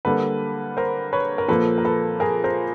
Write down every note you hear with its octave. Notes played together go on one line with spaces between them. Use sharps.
D3 G3 A#3 A4 B4
A#4 C5
B4 C#5
A#4
A#2 F3 A#3 A4 B4
A#4
A4 B4
G#4 A#4
A#4 C5